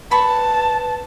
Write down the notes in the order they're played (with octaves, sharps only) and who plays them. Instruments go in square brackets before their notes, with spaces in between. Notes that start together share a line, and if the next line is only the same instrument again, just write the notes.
[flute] B4 [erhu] A5 [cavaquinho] B5 C#6